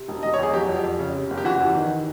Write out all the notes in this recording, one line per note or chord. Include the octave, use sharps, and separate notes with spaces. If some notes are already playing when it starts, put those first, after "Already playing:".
Already playing: C3
E1
E1 D#5
C#5
E2 G#4
F#3 G4
F2
F2
C#3
C3
F#1
G4
E3 F#4
E2
D#3